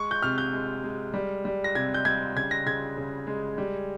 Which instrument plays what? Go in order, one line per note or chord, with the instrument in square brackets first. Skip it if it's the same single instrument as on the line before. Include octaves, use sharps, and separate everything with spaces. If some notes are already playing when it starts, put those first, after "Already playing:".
Already playing: [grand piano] G#3 C#6
G6
C3 F6
G6
G#3
G#3
G3
G3
A#6
C3 G#6
G6
G3 G#6
C#3 G#6
A#6
C#3 G#6
C#3
G#3
G3